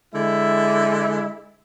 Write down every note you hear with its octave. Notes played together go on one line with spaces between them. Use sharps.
D3 G#3 E4